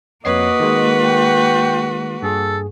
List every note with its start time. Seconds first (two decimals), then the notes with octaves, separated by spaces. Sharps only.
0.25 F2 A#3 F#4 B4 C#5 D#5 C7
0.60 D#3 G#3
1.03 G5
2.23 G2 G#4 A4